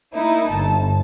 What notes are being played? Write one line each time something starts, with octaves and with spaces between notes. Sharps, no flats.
A#3 D#4 E4
G1 A5